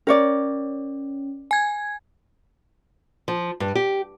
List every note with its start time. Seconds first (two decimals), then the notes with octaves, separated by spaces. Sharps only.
0.07 C#4 A#4 C#5 D5
1.51 G#5 G#6
3.28 F3
3.60 G2
3.75 G4